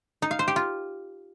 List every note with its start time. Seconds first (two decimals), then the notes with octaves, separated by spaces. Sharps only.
0.22 D#4
0.31 F5
0.39 C5
0.48 G4
0.56 F4